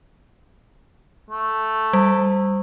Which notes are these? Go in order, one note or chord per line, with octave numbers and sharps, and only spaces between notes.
A3
G3